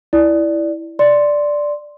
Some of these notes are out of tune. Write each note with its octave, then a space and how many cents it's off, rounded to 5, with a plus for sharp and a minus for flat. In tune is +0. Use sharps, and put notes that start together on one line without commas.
E4 +0 D5 +0
D5 +0 C6 +0